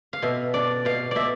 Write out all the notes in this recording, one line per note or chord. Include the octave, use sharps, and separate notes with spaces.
F5
B2 E5
D4 D5
B2 F5
B2 D5 E5